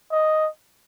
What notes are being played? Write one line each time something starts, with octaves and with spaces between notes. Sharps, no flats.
D#5